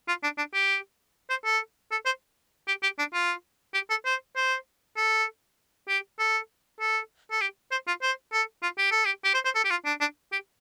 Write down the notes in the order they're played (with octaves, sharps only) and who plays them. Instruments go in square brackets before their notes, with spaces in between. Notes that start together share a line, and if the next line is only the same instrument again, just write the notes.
[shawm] F4
D4
D4
G4
C5
A4
A4
C5
G4
G4
D4
F4
G4
A4
C5
C5
A4
G4
A4
A4
A4
G4
C5
F4
C5
A4
F4
G4
A4
G4
G4
C5
C5
A4
G4
F4
D4
D4
G4